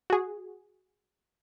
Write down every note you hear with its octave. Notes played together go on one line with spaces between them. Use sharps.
F#4 G#4